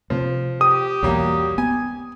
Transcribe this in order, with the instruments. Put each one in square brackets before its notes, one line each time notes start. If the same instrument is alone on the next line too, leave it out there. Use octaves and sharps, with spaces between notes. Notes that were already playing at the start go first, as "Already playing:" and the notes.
[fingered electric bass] C3 A3 [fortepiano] F3
[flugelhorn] G4 [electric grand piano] D#6
[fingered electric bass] B1 E2 [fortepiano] F#3 G3 A#3
[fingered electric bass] B3 [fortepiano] G#5